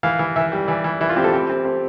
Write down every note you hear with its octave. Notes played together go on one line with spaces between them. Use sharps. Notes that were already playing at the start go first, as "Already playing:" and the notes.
E3 F5
E3
E3 E5
G3
E3 D5
E3
E3 E4
F4
C4 G4
A4
C4 G4
C4
C4